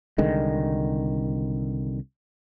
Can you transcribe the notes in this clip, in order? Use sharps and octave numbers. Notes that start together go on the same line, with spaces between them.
C2 D3 D#3 G#3